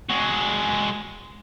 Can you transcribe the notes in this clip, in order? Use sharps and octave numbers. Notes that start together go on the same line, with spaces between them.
G#3 F#4